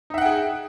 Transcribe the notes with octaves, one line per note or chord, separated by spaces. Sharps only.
D#4 G#4 E5 F#5 G5